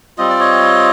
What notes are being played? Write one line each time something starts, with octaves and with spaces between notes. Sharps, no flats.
G3 C4 F4 D#5
D5
C#5 D#5